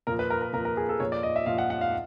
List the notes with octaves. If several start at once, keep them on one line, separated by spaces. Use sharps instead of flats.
A#2 F3 A#4
B4
A#4
A#4
A#2 F3 A#4
A#4
G#4
A4
A#2 F3 C#5
D5
D#5
E5
A#2 F3 F5
F#5
F#5
F5